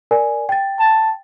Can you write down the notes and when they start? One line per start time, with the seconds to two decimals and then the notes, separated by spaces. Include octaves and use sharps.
0.11 A#4 D5 G#5
0.49 G5 A6
0.79 A5